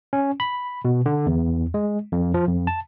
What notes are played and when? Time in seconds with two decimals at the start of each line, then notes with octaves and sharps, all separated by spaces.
0.13 C#4
0.40 B5
0.85 B2
1.06 D3
1.26 E2
1.74 G#3
2.12 F2
2.34 F3
2.48 F2
2.67 A5